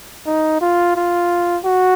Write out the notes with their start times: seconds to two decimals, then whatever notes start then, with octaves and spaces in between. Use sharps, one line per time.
0.26 D#4
0.61 F4
0.96 F4
1.64 F#4